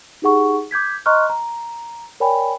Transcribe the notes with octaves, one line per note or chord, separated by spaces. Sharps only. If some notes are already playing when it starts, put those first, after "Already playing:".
D#4 G4 G#4 F#5 C#6
D6 G6 G#6 B6
D#5 A#5 C6 C#6 F6 F#6
A#5
A#4 C#5 D5 G5 G#5 B5